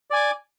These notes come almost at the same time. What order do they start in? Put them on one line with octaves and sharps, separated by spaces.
D5 G#5 D6